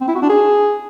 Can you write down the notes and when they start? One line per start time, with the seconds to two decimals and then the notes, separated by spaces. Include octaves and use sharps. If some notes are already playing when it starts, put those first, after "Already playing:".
0.01 C4
0.08 E4
0.15 F#4
0.22 D4
0.29 G#4